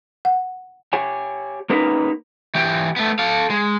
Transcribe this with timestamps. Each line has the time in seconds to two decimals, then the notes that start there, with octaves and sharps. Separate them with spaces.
0.25 F#5
0.93 G4 C#5 G#5
1.70 A#3 C#4 D#4 G4 A#4 B4
2.55 E3 G4
2.96 A3 B3
3.19 A4 F5
3.50 G#3